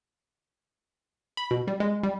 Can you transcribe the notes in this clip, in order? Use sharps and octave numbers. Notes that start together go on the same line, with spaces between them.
B5
B2
G3
G#3
G3